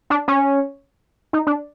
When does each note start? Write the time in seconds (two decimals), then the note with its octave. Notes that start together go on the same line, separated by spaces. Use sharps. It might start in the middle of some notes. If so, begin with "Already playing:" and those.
0.10 D4
0.28 C#4
1.33 D#4
1.47 D4